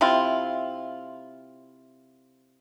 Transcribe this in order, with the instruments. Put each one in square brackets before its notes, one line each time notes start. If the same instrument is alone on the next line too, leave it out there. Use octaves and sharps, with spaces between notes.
[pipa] C3 C4 E4 F4